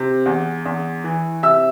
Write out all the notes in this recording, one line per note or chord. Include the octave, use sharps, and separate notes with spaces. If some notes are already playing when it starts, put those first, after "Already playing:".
Already playing: C3
E2
E2
E3
C3 E5 E6